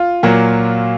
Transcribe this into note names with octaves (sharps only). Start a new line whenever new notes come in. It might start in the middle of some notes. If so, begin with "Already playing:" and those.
Already playing: F4
A#2 F#3 A#3